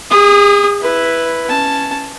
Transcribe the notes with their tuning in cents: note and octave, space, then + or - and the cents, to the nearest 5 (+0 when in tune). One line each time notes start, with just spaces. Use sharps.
G#4 -40 D#6 +0
E4 +0 B4 +0
C#4 +0 A5 +0